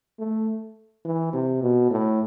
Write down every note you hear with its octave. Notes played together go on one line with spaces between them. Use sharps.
A3
E3
C3
B2
A2